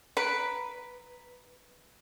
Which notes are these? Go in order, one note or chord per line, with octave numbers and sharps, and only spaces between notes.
B4 A#5 B6 D7